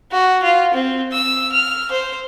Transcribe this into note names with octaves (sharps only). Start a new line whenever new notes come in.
F#4
F4
C4
E6
F6
C5